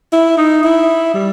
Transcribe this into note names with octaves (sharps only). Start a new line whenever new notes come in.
E4
D#4
E4
G3